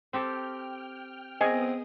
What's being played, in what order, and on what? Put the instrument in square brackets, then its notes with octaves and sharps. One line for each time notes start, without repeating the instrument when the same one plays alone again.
[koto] C4 G4 A4 [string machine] G5 F6
[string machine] B3 D#6 [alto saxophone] C4 [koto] G#4 [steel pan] D#5 G#5